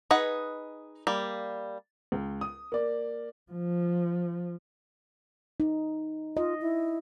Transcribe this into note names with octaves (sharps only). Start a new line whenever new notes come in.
D#4 G#4 B4 D#5 F#5
G3 A#3
C#2
D#6
A#3 D5
F3
D#4
F4 D#5
E4